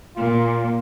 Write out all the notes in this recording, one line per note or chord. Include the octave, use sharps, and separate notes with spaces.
A#2 F4